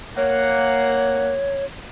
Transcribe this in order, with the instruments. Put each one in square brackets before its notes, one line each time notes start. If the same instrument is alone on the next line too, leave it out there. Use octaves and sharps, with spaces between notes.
[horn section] A#3 F#5 [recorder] C#5